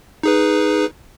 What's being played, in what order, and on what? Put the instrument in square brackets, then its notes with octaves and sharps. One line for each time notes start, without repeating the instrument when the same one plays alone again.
[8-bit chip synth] D#4 G#4 B4